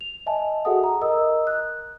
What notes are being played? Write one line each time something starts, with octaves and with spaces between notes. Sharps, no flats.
F7
D#5 E5 G#5 A5
F#4 G#4 A4 E5 F#5 D#6
A#5
A#4 D#5 A#5 D#6 E6
F#6